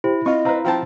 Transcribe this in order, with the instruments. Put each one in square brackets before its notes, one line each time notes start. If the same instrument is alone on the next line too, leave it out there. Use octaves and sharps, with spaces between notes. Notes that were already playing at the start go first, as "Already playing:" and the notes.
[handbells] E4 [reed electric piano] G4 C5
[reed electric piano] C4 [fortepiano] F4 C#6 [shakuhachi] D#5
[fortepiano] C4 B4 [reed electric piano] F5 A#5
[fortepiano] F3 C4 A5 [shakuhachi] G5